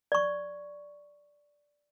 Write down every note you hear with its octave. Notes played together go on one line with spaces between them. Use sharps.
D5 C#6